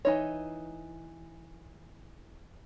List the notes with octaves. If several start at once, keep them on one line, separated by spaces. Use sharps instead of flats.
E3 D#4 C#5